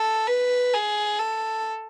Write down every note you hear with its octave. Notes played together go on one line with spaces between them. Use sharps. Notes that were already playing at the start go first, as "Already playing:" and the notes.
Already playing: A4
B4
G#4
A4